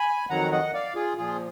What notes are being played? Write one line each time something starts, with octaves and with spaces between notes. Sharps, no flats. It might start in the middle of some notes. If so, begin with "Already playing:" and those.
Already playing: G#5 B5
F2 D#3 F#3 F#5 A#5
D#5 F#5
D5 F5
F4 G#4
A#2 F3 F4 G#4